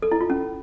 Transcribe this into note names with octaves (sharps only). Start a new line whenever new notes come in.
A4
E4
F4
C#4